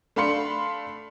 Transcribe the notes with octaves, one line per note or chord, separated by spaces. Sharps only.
A3 D4 F5 B5 C6 C#7